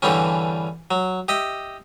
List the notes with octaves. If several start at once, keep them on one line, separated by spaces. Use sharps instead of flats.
E2 G2 D3 E3 G3 C#4
F#3
G4 D#5 E5